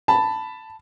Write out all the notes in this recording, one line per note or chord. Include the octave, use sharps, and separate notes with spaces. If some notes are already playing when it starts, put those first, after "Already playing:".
A5 B5